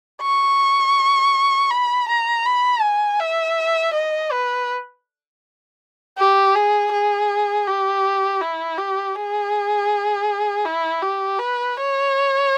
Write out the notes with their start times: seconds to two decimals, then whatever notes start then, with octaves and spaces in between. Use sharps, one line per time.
0.22 C#6
1.70 B5
2.09 A#5
2.46 B5
2.82 G#5
3.20 E5
3.94 D#5
4.32 B4
6.18 G4
6.55 G#4
6.92 G#4
7.67 G4
8.41 E4
8.78 G4
9.16 G#4
10.65 E4
11.02 G4
11.39 B4
11.77 C#5